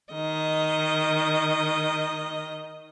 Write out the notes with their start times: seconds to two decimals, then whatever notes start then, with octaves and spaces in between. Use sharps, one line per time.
0.13 D#3 D#5